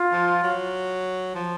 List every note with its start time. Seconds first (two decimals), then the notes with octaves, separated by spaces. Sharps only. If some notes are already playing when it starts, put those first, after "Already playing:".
Already playing: F4
0.12 F3
0.43 F#3
1.35 F3